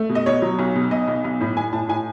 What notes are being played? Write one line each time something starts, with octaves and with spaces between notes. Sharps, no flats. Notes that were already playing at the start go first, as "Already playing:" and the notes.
Already playing: A3
B2
D#5
B2 C#5
F#3
B1
B2
B1 D#5
B1
B1
A2
A2 G#5
A2 A5
A2 G#5